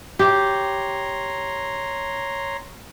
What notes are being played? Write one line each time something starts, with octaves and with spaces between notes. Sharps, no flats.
G4 C#5 A#5 C6